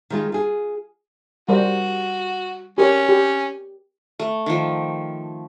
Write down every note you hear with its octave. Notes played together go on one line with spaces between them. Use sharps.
D#3 G#3 F4
F4 G#4
G3 F#4 A#4 C5
C#4 G4 A#4 C#5
G4
A3
D#3 F3